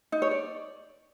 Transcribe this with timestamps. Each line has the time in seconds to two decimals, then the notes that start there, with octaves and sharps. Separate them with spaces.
0.12 D#4
0.22 C#5
0.31 D5